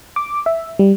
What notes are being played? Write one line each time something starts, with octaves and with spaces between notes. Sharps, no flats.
D6
E5
G3